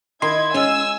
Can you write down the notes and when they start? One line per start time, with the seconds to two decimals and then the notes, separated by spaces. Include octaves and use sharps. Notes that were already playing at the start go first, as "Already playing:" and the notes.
0.22 D#3 E4 D#5 C6 G#6
0.54 G#3 C#4 F4 G#5 E6